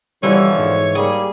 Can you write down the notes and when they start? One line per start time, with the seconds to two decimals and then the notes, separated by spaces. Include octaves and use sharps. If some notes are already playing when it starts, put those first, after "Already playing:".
0.23 B2 D3 E3 F3 G3 C#5
0.58 G#2
0.95 G3 A#3 G#4